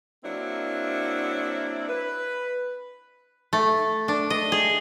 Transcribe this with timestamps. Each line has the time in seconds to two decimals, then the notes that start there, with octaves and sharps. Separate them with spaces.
0.24 F#3 A#3 C4 D4 E4
1.88 B4
3.53 A3
4.08 D4
4.30 D#5
4.52 G#4